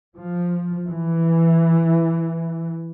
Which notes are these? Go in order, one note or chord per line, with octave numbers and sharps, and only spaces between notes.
F3
E3